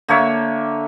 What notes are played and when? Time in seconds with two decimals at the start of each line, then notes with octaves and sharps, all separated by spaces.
0.08 D3 A#3 C#5 E5